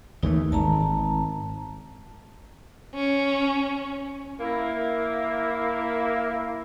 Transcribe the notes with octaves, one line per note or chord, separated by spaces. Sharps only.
D#2 E3 A3 D#4
G#1 A5 A#5
C#4
A#3 E4